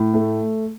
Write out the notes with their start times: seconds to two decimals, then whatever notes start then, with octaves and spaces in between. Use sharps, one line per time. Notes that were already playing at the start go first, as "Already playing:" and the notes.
Already playing: A2
0.14 A3